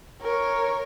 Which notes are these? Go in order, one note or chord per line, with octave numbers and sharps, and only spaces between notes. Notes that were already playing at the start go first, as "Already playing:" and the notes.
A#4 C#5